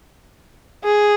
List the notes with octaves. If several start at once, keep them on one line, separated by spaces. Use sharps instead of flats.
G#4